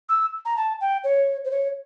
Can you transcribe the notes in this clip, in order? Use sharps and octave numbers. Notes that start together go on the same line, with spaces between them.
E6
A#5
A5
G5
C#5
C5
C#5